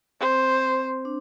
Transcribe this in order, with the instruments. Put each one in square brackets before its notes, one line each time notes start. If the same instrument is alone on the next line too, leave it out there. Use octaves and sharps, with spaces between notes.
[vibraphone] C4 [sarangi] C5
[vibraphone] D4